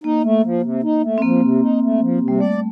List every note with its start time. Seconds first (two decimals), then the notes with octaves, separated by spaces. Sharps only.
0.04 A#3 D#4
0.23 A3
0.43 F3
0.62 C3
0.83 D#4
1.03 A3
1.18 C4
1.22 F3 A#3
1.42 C3
1.61 D#4
1.82 A3
2.00 F3
2.21 C3
2.28 G3
2.40 A3 D5